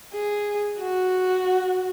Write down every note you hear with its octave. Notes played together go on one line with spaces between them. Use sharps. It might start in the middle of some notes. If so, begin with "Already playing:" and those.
G#4
F#4